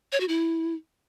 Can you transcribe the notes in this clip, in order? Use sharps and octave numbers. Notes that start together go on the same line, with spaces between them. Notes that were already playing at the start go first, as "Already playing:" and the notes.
C#5
F#4
E4